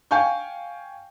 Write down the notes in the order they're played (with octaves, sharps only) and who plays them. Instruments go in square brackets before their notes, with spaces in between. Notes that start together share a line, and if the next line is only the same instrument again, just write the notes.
[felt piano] F5 G5 G#5 C#6 G6